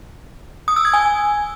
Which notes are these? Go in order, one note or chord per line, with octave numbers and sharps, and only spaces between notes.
D#6
E6
G#6
G#5